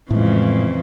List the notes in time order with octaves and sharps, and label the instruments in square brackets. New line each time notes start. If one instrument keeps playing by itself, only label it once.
[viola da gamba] F2 C#3 E3 [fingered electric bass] A2 G#3